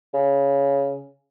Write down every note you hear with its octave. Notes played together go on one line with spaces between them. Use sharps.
C#3